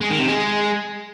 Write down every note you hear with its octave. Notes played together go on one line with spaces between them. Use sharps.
G#3
D#3
C3
G#3